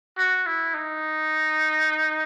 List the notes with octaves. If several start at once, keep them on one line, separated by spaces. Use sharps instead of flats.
F#4
E4
D#4